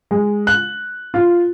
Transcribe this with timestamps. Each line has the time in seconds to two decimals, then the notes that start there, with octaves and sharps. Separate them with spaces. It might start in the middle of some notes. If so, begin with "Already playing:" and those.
0.11 G#3
0.47 F#6
1.14 F4